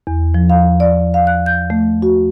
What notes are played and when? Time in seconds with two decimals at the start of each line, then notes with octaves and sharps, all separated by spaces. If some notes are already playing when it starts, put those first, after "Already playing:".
0.07 E2
0.34 F3
0.50 F5
0.80 D5
1.14 F5
1.27 F#6
1.46 G6
1.70 A3
2.02 F#4